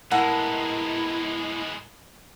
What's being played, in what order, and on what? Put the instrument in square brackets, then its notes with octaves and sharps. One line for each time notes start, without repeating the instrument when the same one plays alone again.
[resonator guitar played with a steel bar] A2 A#4 [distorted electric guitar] G#3 B3 [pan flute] E4 [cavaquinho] F#5